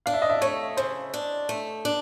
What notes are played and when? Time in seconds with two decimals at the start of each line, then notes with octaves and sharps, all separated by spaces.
0.06 D4 F5
0.14 E5
0.22 D#5
0.30 E5
0.41 A3 C#5
0.77 C#3 C5
1.14 D4
1.49 A3
1.85 D4